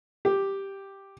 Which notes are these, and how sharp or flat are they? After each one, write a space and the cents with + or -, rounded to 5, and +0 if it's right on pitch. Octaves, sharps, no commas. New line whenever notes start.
G4 +0